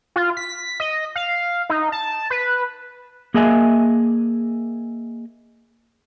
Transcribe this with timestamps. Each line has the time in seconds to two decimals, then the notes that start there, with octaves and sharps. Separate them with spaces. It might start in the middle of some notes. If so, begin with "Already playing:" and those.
0.16 F4
0.37 B6
0.80 D#5
1.16 F5
1.70 D#4
1.92 A5
2.30 B4
3.34 A#3 G#4 D#5 E5 G#5